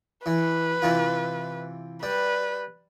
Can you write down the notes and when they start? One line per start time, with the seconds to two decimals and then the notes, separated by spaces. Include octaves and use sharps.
0.26 E3 B4
0.82 C3 E3 F4
2.03 G3 B4